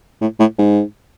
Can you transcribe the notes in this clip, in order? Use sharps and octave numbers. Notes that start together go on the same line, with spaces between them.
A2
A2
G#2